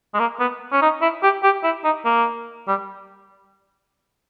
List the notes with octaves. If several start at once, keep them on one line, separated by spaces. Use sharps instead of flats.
G#3
A#3
B3
C#4
D#4
E4
G4
G4
E4
D#4
A#3
G3